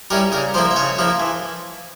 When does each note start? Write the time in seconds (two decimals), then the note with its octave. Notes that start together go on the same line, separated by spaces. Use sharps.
0.10 G3 C#4 E4 A#4
0.32 C#3 A#4
0.54 F3 A#3 E4 C5
0.71 E5
0.76 C#3 C#5
0.98 F3 A#3 E4
1.20 E3